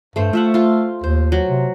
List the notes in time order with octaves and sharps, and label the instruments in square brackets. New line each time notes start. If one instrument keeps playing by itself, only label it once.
[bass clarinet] G2 [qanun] A3 C5
[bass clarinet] A3 [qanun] F4 E5 F#5
[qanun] F4 C6
[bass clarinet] D#2 [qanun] C5
[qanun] F#3
[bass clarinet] C3